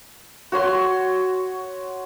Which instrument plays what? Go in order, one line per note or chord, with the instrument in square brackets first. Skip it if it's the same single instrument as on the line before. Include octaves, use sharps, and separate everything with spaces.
[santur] F#4 C#5 C6